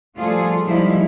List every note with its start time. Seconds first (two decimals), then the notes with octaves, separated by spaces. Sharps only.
0.16 F3 G3 A3 F4 G#4 A4
0.64 F3 G3 G#3 D#4 E4